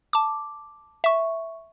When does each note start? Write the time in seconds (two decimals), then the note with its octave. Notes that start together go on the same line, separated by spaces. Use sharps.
0.13 A5 D6
1.04 E5 C#6